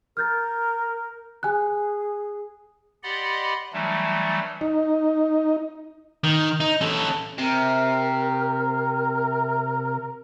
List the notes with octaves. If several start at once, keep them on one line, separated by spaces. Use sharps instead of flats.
A#4 F6 G6 A6
G#4 G#5 F#6
G4 D5 D#5 F#5 B5 C6
E3 F#3 G3 A3 D4
D#4
D#3
D#4
C#4 A4
C3 A#4